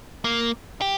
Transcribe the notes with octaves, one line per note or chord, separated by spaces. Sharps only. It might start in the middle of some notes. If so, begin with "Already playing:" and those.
A#3
G4